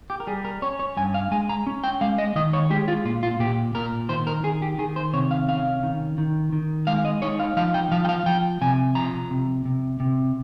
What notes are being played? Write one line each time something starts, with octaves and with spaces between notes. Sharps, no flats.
G4
A#4
G3 G#4
A#4
C#4 C#5
C#5
G2 G#5
F5
G#3 G#5
A#5
C#4
G5
G#3 F5
D#5
D#3 D#5
C#5
G#3 G4
F4
A#2 F4
F4
A#2 G4
A#2 A#4
D#3 C5
A#4
D#3 G#4
G4
D#3 G#4
C5
C3 C#5
F5
C#4 F5
D#3
D#3
D#3
G#3 F5
D#5
D#4 C#5
F5
F3 F5
G5
F3 F5
G5
F5
F3 G5
C3 G#5
F3 A#5
C3
C3
C3